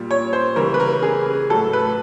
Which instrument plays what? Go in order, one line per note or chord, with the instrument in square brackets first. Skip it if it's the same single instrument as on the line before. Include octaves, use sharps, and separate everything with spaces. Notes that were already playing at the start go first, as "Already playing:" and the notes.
Already playing: [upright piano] A#2 G3
C#5
C5
C#3 E3 G3 A#4
B4
A#4
G#4
A2 F#3 A4
B4